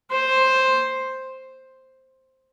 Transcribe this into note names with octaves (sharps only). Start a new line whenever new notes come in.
C5